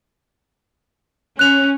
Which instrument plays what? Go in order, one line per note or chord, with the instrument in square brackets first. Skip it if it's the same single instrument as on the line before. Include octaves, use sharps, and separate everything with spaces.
[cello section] C#4 [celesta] F#6 F7